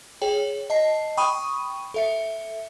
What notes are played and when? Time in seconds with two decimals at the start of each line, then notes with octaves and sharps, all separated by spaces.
0.22 G#4 C#5 G5
0.70 D#5 A5 C7
1.17 G5 B5 C#6 D#6 D#7
1.94 A4 E5 C#7